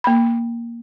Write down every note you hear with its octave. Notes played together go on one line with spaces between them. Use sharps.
A#3 B5